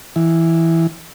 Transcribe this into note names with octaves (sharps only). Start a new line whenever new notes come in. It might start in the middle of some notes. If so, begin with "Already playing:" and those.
E3